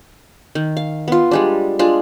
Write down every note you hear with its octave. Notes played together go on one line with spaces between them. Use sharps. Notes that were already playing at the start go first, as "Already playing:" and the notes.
D#3
F5
B3 F4
G3 G#3 D4
G#3 D4 F4